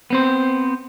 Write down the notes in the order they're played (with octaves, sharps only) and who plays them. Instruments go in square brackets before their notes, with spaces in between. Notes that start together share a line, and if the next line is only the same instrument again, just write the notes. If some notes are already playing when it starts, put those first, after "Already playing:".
[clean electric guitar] B3 C4 C5